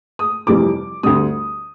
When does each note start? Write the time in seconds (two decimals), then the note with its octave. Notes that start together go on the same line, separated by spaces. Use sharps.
0.19 D#6
0.46 F1 F2 C3 E3 G3 D6
1.03 D2 D3 G3 D#6